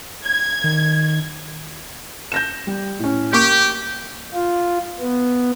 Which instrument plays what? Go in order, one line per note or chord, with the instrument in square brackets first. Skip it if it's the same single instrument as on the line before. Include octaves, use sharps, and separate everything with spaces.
[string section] G#6
[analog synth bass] D#3
[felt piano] G6 A#6 E7
G3
A2 C#4
[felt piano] A#3 C#6 D6 [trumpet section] G4
[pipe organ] F4
B3